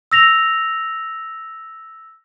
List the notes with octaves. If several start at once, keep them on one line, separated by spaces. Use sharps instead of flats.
E6 A#6 F7